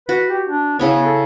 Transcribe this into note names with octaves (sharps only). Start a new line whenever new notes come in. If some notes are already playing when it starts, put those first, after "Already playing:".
F#4 B4
G4
D4
C#3 B3 E4 C#5
A4